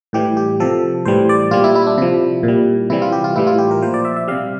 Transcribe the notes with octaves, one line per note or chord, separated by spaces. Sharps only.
A2 E3 G3 G4
G4
C3 F3 A4
A2 E3 G3 C5
D5
A#2 G3 F4
E4
E4
D4
C3 F3 E4
A#2 G3
C3 E3 G3 E4
F4
G4
F4
A2 E3 G3 E4
F4
G4
A#4
A#2 F3 C5
D5
E5
E5
C3 G3 F5